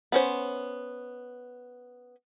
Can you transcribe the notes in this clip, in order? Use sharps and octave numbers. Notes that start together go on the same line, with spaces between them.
B3 C#4 C5